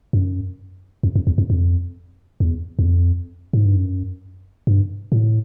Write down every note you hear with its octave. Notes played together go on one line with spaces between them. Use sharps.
F#2
F2
F2
E2
F2
F2
E2
E2
F2
G#2
G2
F#2
G2
A2